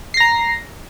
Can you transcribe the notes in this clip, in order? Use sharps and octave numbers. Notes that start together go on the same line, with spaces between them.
A#5 A#6 C7